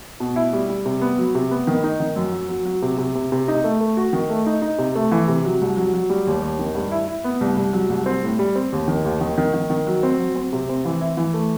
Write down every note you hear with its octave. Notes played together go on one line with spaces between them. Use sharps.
B2
E4
G3
G3
C3
B3
F#3
C3
B3
D#3
D#4
D#3
F#2
F#3
F#3
F#3
C3
C3
C3
C3
D#4
A3
A3
F#4
D#3
A3
D#4
D#4
C3
A3
E3
C3
F#3
C2
F#3
F#3
G3
D#2
D#2
D#3
G2
E4
E4
B3
C2
C2
F#3
C2
C4
A2
G3
C4
D#2
D#3
D#2
D#3
D#3
D#3
D#3
F#3
C4
F#3
C4
C3
C4
E3
E4
E3
A3